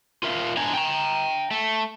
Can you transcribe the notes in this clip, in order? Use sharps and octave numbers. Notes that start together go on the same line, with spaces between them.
F4 A#4 E5 F5
E2 G#3 D4 G#5 A#5
G5 A#5
A3